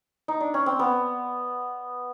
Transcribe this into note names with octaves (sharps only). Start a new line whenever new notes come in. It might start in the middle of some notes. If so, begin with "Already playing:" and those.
D#4
D4
C#4
C4
B3